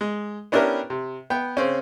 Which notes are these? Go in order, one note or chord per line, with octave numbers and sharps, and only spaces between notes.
G#3
B3 C#4 D4 E4 G4 A#4
C3
B3 G5
C#3 C4 C#4